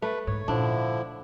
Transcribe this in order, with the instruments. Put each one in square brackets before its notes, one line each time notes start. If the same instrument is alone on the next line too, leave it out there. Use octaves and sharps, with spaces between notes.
[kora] A3 [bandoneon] B4
[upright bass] G#2 D3 [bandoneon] C#5
[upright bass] A#2 [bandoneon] D3 F3 E4 [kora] D4